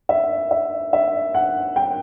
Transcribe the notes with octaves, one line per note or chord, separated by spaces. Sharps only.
E5
E5
E5
F#5
G5